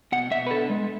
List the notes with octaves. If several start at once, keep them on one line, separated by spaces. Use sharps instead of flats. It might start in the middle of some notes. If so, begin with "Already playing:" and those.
B2 F#5
B2 E5
B4
D3 A4
G#3